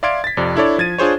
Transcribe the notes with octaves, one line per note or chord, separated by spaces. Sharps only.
D5 E5 F5 C6 G#6 D7
A6 B6
F2 C3 D5
D4 E4 A4 C#5 D5
F3 G#6 A6 D#7
D4 F4 G#4 C5 C#5